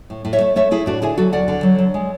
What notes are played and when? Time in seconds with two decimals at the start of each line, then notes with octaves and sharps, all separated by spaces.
0.10 A2
0.25 A2
0.33 C#5 E5
0.41 A3
0.56 A3 C#5 E5
0.71 A3 E4 G#4
0.86 A2 D4 F#4
1.02 D3 E4 G#4
1.18 F#3 F#4 A4
1.33 D2 D5 F#5
1.48 D3
1.63 F#3
1.79 F#3
1.94 G#3